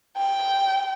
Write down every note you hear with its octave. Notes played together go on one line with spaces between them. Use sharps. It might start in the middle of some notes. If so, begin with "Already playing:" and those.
G5